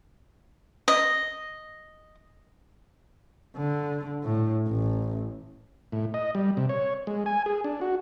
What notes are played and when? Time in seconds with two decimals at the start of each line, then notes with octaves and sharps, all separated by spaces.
0.88 D#5
3.56 D3
4.23 A2
4.68 A1
5.92 A2
6.14 D#5
6.35 G3
6.57 C3
6.69 C#5
7.07 G#3
7.26 G#5
7.46 G#4
7.64 D4
7.81 F#4